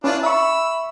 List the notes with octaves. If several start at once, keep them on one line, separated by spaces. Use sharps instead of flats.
C#4 D4 E4 F4 B4
E5 B5 C#6 E6